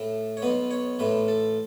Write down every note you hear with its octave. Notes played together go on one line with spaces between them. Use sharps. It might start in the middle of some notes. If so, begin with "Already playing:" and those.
Already playing: A2 A3
C#5
B1 B2 B3 B4
C#5
A1 A2 A3 B4
A4